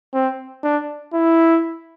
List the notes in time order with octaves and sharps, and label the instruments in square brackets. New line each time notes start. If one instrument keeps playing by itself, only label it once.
[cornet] C4
D4
E4